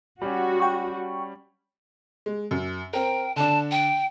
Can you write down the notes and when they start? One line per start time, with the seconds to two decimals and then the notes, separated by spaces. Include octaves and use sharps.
0.22 G3 C#4 F#4
0.60 G5 C#6
2.26 G#3
2.51 F#2
2.93 C4 A#4 G5
3.36 D3 D4 A5
3.71 G5